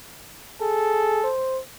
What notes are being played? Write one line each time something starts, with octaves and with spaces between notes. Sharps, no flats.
G#4 A4
C5